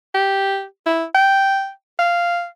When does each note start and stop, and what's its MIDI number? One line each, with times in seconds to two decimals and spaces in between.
0.14 0.64 67
0.86 1.04 64
1.14 1.70 79
1.99 2.46 77